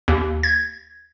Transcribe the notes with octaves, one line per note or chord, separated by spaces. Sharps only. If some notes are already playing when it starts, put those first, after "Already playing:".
D#2
G#6